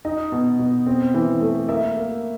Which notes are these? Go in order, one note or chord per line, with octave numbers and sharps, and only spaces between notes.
D#4 D#5
B2
B2
C4
E3
A3
A#3 E5
A#3